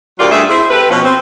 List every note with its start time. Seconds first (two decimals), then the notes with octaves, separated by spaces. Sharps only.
0.19 D2 F#3 F4 G4 A#4 D5
0.31 G2 A3 G#4 E5
0.49 C4 E4 G#4
0.70 C4 G4 A4 B4
0.90 B2 F3 C#4
1.04 C4